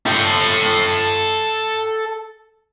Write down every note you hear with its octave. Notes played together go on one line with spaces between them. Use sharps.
A4 G5